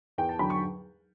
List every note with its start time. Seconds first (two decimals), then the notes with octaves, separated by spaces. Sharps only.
0.18 E2 G5
0.29 A5
0.39 D3 F#3 B5
0.50 C#6